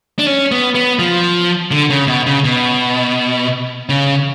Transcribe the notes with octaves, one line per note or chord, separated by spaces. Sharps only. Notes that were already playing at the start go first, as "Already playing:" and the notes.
D4
C#4
B3
B3
F3
D3
C#3
B2
C#3
B2
C#3